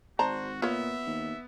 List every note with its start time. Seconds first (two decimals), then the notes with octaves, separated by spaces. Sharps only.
0.19 G#1 F#4 C5 D5 A5 A#5
0.62 A#2 B3 F4 C#5 E5
1.07 D#2